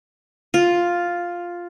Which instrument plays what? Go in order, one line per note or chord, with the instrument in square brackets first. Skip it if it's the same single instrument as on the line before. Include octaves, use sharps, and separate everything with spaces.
[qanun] F4